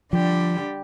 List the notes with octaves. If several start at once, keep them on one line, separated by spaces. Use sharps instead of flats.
D3 F3 G3 G4